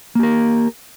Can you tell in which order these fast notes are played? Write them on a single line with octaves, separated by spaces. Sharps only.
A#3 G4 A#4